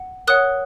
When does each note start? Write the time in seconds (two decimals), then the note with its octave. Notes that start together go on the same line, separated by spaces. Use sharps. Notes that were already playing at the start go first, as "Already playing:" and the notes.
Already playing: F#5
0.27 A#4 C#5 F#5 D#6 F#6